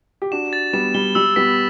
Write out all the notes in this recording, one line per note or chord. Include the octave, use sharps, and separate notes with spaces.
G4
D4 F#4 E7
A6
G3 B3 E7
G3 G7
G3 E6
G3 B3 B6